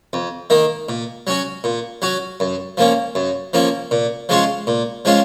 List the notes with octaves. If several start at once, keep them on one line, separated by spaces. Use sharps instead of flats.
F2
D#3 A#3 D#4
A#2
F#3 C#4 F#4
A#2
F#3 C#4 F#4
F#2
F3 A#3 C#4
F#2
F3 A#3 C#4
A#2
F3 G#3 C#4 F4
A#2
F3 G#3 C#4 F4